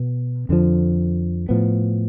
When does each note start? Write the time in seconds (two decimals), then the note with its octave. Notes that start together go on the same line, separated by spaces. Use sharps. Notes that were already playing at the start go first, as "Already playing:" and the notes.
Already playing: B2 B3
0.49 F2 D3 F3
1.49 A2 F3 B3